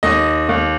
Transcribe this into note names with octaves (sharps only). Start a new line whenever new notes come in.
D#2 D#5
D#2